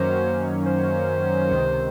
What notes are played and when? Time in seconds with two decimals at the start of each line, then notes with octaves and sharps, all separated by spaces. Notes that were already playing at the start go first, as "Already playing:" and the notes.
Already playing: F#2 D#3 F#3 A#3 C#4 C5
0.66 C5
1.51 C#2 C3 D#3